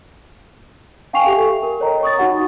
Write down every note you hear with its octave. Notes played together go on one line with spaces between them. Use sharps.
F5 G5 G#5 C#6 C7 F7
G4 A4 E5
A#4
A#4 C#5 D#5 G5 A#5
C#6 D#6 A6
D#4 F#4 F#5 C#6